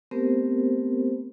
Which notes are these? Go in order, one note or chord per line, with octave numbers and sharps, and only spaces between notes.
A3 B3 C4 G4 A#4 C5